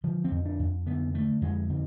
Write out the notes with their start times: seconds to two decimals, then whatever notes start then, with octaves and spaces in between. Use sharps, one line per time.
0.04 D3 F3
0.24 C4
0.31 F2
0.46 D4
0.59 F2
0.86 D3 B3
1.14 D3 A3
1.42 F2 G#3
1.69 D3 C4